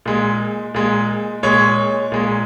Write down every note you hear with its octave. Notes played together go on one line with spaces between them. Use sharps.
A#2 G#3
A#2 G#3
A#2 G#3 C#5
A#2 G#3